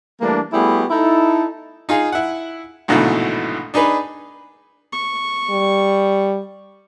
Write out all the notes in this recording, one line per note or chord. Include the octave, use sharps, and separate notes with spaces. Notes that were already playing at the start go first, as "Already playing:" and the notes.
E3 G3 A3 A#3 D4
G3 A3 B3 E4 F#4 G#4
D#4 E4 A4
D#4 F4 G#4
E4 F#5
A#1 G#2 B2 D3 E3 A3
D4 D#4 G#4 B4
C#6
G3